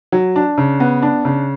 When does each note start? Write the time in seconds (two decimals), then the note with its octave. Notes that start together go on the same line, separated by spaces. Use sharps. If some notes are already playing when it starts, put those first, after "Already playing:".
0.12 F#3
0.36 D4
0.58 C#3
0.80 B3
1.02 D4
1.25 C#3